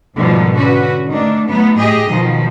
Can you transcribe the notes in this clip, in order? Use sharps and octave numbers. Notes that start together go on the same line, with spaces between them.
G#2 B2 D3 D#3 F3 G3
D3 C#4 F#4 B4
D#3 A3 D4
F#3 A3 B3 D#4
A2 G4 G#4 D#5
B2 D#3 F3 F#3